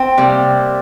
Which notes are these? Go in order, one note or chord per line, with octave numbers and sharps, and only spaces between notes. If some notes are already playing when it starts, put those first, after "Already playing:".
Already playing: C4
C3 G3 A#3